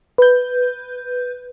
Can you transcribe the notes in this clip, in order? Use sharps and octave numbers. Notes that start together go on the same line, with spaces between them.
B4 G6